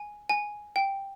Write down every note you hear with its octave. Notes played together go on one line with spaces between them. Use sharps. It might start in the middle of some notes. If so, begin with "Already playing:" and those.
Already playing: G#5
G#5
G5